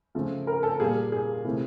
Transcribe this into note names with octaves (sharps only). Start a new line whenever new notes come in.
C#3 F3 A3
A#4
A4
A#2 G3 A#3 G#4
G#4
C3 E3 A3 C4